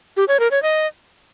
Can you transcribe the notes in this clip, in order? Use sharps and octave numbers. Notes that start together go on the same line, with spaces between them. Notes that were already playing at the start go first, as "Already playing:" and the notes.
G4
C#5
A#4
C#5
D#5